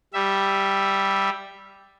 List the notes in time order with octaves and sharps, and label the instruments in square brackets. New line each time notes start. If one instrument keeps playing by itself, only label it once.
[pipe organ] G3 E5